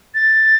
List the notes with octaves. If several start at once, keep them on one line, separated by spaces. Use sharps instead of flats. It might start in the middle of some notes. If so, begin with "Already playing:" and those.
A6